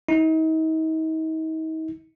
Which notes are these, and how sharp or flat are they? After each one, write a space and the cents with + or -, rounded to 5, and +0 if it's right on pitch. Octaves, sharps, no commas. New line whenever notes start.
D#4 +40